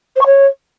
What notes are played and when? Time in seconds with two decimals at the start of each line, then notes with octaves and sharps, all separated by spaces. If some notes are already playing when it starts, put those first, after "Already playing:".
0.15 C5
0.21 C#6
0.26 C#5